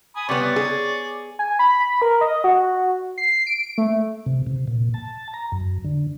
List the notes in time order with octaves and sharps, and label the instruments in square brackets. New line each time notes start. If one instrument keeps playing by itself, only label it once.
[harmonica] G#5 B5 D#6
[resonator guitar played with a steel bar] C3 G3 B3 [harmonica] C#5 D5
[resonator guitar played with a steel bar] G#4
[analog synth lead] G#5
B5
A#4
D#5
F#4
C7
D7
A3
[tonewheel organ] C3
C3
A#2
A5
A#5
F#2
D3